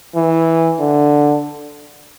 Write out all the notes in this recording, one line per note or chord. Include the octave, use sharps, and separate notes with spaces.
E3
D3